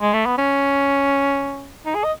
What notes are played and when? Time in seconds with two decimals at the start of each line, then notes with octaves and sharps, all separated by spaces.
0.01 G#3
0.13 A3
0.26 B3
0.38 C#4
1.86 D#4
1.95 G#4
2.04 D#5